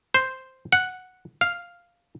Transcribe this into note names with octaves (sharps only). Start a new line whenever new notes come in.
C5
F#5
F5